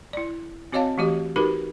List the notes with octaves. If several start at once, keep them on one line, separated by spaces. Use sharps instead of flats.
E4 D5
C4 F#4 C#5 D#5 F5 A5
E3 A3 F#4 G4 D#5
D#4 F#4 G4 A#4 B4